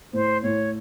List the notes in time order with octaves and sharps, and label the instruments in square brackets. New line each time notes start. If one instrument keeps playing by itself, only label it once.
[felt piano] A2 [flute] C5
[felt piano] A2 [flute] C#5